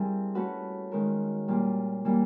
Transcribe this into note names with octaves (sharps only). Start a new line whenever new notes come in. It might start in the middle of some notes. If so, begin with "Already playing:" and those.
Already playing: G3 C4 D4 E4 G#4 A#4
A3 C#4 F#4 B4
D#3 G#3 C#4 F#4 A#4
A#2 G3 A#3 C#4 F4
E3 G3 A#3